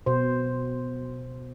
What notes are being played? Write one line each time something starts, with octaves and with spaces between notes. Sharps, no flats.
B2 C5